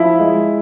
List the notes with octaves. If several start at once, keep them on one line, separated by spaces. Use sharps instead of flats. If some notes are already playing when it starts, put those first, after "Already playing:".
Already playing: F3 E4
G#3